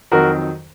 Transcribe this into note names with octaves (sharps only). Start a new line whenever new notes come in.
F2 D#3 F#3 F#4 A#4